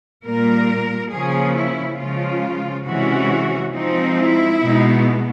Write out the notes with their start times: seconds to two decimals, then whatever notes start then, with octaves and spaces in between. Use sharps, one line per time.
0.25 A#2 G3 A#3 A#4
1.12 C#3 F3 A#3 C#4 G#4
1.56 E4
1.99 C#3 F3 G#3 F4
2.86 C3 E3 G#3 C#4 F#4
3.74 F3 G#3 C4 D#4
4.17 E4
4.61 B2 G#3 B3 D#4